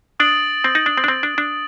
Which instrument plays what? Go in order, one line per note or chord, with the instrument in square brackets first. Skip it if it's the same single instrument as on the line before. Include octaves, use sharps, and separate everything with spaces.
[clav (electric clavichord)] D4 [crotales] D#6 A6 D7 F#7
[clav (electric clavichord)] C4
D#4
D4
C4
D4
C4
D4
D4